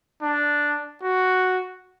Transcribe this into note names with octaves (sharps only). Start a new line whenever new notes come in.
D4
F#4